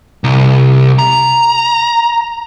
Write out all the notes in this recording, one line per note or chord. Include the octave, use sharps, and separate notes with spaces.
C2
A#5